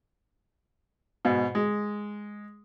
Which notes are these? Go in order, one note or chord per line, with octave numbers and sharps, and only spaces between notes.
G#2 B2
G#3